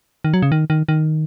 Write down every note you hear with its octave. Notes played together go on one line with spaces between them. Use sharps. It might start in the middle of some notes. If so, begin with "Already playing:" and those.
D#3
F#3
C#3
D#3
D#3
D#3